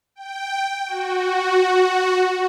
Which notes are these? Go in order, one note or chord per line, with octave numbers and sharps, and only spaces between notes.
G5
F#4